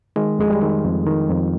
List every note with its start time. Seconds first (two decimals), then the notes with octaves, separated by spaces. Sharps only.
0.16 D#3 G#3
0.39 F2 G#3
0.50 G3
0.62 D#3
0.84 F2
1.06 D#3
1.29 F2